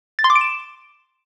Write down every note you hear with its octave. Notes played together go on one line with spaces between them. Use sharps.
A6
C6
D6
D7
E7